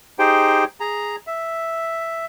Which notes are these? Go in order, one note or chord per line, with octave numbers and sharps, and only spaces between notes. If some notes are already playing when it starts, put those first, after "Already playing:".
D#4 G4 G#4 C5 G5
G#4 A#5
E5